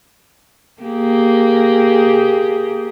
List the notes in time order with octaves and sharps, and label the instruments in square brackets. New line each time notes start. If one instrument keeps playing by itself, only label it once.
[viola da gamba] A#3 G4 G#4